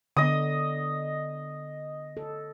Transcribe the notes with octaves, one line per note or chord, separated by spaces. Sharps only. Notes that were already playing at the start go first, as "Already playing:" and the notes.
D3 B3 D#5 D#6
A4